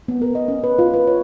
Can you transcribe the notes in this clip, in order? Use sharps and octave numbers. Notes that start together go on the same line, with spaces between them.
B3
A#4
D#5
C#4
B4
F4
B4
C#5